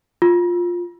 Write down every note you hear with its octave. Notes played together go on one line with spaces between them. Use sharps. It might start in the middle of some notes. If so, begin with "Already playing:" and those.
F4